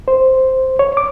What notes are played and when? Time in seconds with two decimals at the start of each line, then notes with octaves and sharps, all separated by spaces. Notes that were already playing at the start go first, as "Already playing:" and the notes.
0.08 C5
0.79 C#5
0.97 D6